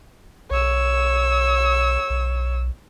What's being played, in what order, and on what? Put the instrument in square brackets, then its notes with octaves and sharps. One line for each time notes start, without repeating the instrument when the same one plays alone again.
[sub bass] B1 [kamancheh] C#5 E6
[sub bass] B1